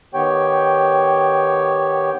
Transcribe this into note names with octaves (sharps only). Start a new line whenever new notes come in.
D#3 B3 G4 C#5 G5